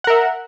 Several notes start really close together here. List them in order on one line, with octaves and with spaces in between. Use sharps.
F#5 A#4 E5